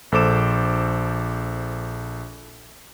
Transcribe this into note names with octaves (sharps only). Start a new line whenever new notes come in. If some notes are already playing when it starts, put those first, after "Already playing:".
A#1 A4 C5 D6 E7